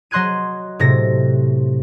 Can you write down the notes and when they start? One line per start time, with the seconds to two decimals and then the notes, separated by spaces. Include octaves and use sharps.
0.11 F#3 D#5 C6 F#6 G#6 D#7
0.79 A2 C3 A#6